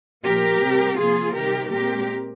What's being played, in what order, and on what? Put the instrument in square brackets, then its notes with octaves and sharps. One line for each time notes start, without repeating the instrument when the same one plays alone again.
[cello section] A#2 F3 A#3 G4 A#4
C3 G3 C4
C3 F3 A#3 F4 G#4
C3 D#3 G3 G4 A#4
A#2 G#3 C4 G4 A#4